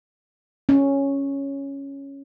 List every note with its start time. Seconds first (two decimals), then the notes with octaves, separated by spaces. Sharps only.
0.69 C#4